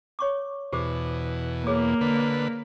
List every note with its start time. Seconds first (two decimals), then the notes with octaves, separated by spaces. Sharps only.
0.19 C#5 C#6 D6
0.73 E2 B2 G4 C5 D6
1.67 A#3 G#4 C#5 D6
2.01 D3 B4